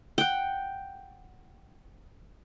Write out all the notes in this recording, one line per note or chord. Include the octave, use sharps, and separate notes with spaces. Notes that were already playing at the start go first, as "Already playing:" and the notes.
F#5 G5